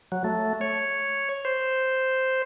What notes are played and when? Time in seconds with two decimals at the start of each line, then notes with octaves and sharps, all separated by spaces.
0.12 F#3
0.24 A3
0.61 C#5
1.45 C5